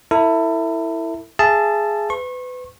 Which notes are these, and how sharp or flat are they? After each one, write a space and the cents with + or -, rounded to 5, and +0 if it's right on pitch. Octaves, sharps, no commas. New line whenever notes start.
E4 +0 A4 +40
G#4 +0 E5 +35 A5 +0
B4 +30 C#6 -35